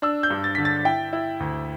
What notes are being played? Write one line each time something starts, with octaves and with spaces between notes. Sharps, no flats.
D4 E6
G6
G2
A6
D3 B6
A6
E4 G5
E4
D2